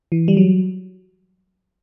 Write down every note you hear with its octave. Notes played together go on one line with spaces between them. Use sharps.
E3
G3
F#3